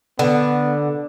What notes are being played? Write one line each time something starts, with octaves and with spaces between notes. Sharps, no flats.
D3 B3